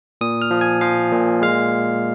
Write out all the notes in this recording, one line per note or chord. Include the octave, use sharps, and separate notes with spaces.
A#2 D#6
F6
F3
G#5
F3 F5
A#2
G#3 F5